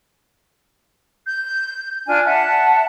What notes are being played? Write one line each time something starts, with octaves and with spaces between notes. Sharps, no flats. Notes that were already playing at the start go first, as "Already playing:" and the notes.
G6
D4 F4 G#5 F6
E5 F#5 A5